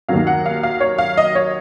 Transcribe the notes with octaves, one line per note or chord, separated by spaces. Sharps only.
D#2 D#3 F#3 F5
F#5
F5
F5
C#5
F5
D#5
C#5